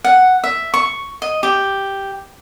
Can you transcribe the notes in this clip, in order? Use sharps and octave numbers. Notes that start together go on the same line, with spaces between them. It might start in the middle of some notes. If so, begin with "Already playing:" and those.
F#5
E5
C#6
D#5
G4